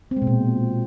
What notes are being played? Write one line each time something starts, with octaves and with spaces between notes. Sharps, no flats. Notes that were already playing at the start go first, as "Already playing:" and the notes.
C4
G#3
B2
A#2